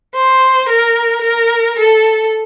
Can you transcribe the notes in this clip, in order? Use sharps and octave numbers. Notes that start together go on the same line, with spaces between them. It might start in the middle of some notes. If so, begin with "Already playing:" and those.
C5
A#4
A#4
A4